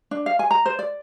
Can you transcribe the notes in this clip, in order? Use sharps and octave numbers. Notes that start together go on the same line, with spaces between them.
D4
F5
G#5
A#5
C5
D5